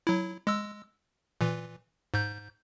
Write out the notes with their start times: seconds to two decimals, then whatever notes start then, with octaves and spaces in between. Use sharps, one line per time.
0.07 F#3 E4
0.47 G#3 E6
1.41 A#2 E3
2.14 G#2 G6